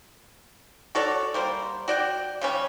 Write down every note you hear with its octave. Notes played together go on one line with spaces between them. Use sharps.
F#4 A4 C#5 D5
G3 A#3 C5
F#4 D5 G5
C#3 G3 C#4